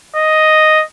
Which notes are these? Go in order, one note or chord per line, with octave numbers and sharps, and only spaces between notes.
D#5